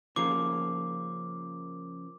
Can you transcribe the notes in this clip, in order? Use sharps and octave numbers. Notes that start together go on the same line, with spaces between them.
C#3 F3 A#3 D6